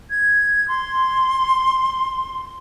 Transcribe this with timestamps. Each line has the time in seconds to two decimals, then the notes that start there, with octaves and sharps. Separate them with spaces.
0.10 G#6
0.68 C6